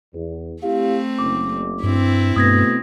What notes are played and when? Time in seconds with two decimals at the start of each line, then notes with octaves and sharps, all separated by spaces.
0.14 E2
0.63 A3 C4 E4 G4 F5
1.19 F#1 D6
1.83 G2 C4 E4
2.36 G2 B2 A3 B3 D#6 G#6 A#6